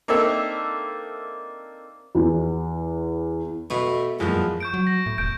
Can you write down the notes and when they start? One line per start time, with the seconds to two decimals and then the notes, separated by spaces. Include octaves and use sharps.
0.08 A#3 C4 D4 D#4 A4 E5
2.15 E2
3.70 B2 A3
4.20 F#2 A#2 E3 F3 G#3
4.60 C#6 G6 D7
4.74 F#3
4.87 A#6
5.06 A2
5.18 E1 G6 D7